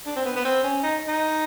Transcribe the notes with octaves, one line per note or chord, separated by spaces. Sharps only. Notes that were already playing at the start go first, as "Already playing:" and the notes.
D4
C4
B3
B3
C4
C#4
D#4
D#4